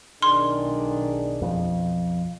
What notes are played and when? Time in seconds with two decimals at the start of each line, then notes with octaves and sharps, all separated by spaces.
0.22 B1 D#3 D4 G#4 C6
1.42 F2